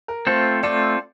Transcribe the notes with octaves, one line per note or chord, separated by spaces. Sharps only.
A#4
A3 C4 F4 A4 C5
A3 C4 F4 A4 D5